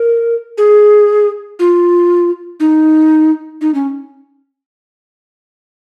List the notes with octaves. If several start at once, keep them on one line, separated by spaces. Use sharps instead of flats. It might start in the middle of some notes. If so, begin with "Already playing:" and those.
Already playing: A#4
G#4
F4
D#4
D#4
C#4